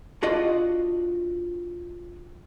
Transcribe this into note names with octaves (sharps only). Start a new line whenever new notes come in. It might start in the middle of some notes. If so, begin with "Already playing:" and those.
D4 F4 F#4 D5 D#5